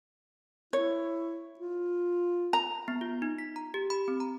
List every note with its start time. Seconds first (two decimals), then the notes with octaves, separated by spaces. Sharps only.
0.73 E4 C#5
1.59 F4
2.53 A#5
2.88 B3
3.01 F4
3.22 D#4
3.38 B6
3.56 A#5
3.74 G4
3.90 B5
4.08 C4
4.20 A#5